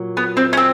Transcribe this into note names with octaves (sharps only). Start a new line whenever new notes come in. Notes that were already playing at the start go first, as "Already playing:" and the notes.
Already playing: A#2 F#3
B3
C4
C#4
C4